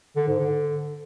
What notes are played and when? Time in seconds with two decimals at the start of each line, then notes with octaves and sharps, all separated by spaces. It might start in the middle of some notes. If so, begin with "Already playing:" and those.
0.16 D3
0.28 G#2
0.40 D3